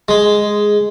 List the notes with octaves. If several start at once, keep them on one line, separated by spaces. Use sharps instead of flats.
G#3